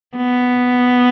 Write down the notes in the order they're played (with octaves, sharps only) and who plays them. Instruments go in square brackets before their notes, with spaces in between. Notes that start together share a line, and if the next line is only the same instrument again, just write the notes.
[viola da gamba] B3